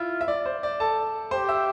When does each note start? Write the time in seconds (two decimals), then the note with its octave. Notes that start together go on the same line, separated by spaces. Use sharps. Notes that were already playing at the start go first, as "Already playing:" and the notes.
Already playing: E4 F4 E5
0.21 E5
0.28 D5
0.46 C5
0.63 D5
0.80 A4 A5
1.31 G4 C5 C6
1.48 E5 E6